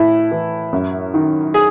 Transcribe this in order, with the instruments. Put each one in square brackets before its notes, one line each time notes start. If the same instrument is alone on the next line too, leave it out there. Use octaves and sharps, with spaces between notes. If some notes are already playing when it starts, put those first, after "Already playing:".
Already playing: [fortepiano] A2 E4
E3
F#2
D#3
G#4